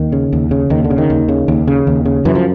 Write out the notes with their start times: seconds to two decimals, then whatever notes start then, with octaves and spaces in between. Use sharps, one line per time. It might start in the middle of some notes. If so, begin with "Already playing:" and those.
Already playing: D#2 D#3
0.12 C#3
0.33 D#2
0.51 C#3
0.70 D#2 D#3
0.84 D3
0.90 C#3
0.98 D#3
1.10 D#2
1.28 C#3
1.48 D#2
1.68 C#3
1.87 D#2
2.05 C#3
2.25 F#2 E3
2.35 F3